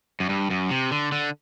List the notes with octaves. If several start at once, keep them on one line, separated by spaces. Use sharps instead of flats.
F#2
G2
F#2
C3
D3
D3